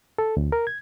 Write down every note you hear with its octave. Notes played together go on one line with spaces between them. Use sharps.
A4
D2
A#4
G#6